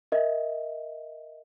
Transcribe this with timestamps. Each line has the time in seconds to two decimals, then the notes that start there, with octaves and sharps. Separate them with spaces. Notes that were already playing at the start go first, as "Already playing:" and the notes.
0.12 A#4 D#5 E5